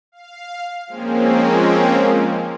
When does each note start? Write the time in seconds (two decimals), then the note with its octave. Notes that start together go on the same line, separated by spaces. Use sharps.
0.12 F5
0.87 F3 G#3 A#3 C4 C#4